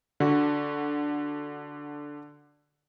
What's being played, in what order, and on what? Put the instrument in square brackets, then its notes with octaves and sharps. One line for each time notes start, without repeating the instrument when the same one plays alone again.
[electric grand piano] D3 F#4